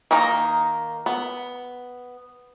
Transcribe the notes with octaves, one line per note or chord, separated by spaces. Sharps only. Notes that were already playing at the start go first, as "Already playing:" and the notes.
D#3 A#3 D#4 A#5
B3